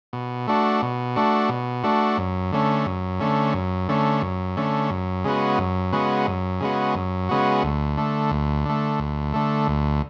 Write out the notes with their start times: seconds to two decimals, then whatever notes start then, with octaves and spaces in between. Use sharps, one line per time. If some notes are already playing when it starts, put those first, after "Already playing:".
0.13 B2
0.47 A3 D4 F#4
0.82 B2
1.16 A3 D4 F#4
1.49 B2
1.83 A3 D4 F#4
2.18 F#2
2.52 D3 A3 C#4
2.86 F#2
3.20 D3 A3 C#4
3.54 F#2
3.88 D3 A3 C#4
4.22 F#2
4.57 D3 A3 C#4
4.90 F#2
5.25 C#3 G#3 B3 F#4
5.59 F#2
5.93 C#3 G#3 B3 F#4
6.27 F#2
6.60 C#3 G#3 B3 F#4
6.95 F#2
7.29 C#3 G#3 B3 F#4
7.63 D2
7.97 D3 A3
8.31 D2
8.65 D3 A3
8.99 D2
9.33 D3 A3
9.68 D2